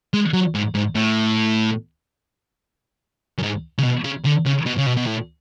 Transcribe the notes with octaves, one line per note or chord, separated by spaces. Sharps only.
G#3
F#3
G#2
G#2
A2
F#2
G#2
C#3
B2
C#3
D3
C#3
B2
C#3
B2
B2
A2